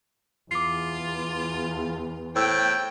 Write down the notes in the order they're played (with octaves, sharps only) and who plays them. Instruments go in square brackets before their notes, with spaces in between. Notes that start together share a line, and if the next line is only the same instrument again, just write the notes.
[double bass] E2 [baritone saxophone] F4 [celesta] D6 C7
[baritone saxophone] A2 [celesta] C5 E6 [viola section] G5